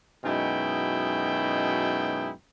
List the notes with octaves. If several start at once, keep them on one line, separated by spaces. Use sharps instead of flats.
F#2 B2 G#3 D#4 E4 G5